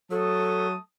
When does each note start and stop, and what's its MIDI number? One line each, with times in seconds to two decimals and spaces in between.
0.11 0.74 54
0.11 0.80 57
0.11 0.67 69
0.11 0.80 81
0.11 0.80 87